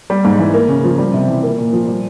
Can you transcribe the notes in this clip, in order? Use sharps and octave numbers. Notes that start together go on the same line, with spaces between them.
G3
G#2
E3
A#3
C#3
F3
G3
C3
E3
A#3
A#2
F3
G3